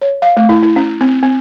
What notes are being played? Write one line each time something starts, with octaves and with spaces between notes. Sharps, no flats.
C#5
F5
A3
E4
E4
C#4
C4
C4